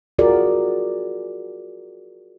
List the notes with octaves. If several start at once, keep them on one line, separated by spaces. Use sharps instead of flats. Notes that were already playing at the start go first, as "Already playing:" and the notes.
F4 F#4 G#4 A#4 D5